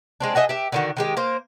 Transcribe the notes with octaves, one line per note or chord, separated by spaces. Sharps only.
G#3 C4 D4
F#4 G#4 D#5 E5
G4 E5
D3 D#3 F#4
D#3 G#3 G4
A#3 C5